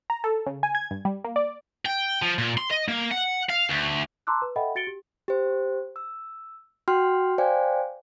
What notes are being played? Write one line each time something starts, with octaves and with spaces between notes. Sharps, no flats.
A#5
A4
C#3
G#5
G#6
G2
G3
A#3
D5
G5
F3
A#2
C6
D#5
A#3
F#5
F5
D2
A5 A#5 C6 D6 E6 F#6
B4
A4 D#5 E5 F#5 G5 B5
F#4 A6 C#7 D7 G7
G4
G4 C5
E6
F#4 G5 C6 F6
C5 D5 F5 G5 G#5